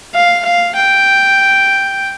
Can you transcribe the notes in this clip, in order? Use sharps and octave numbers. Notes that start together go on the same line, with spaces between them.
F5
F5
G5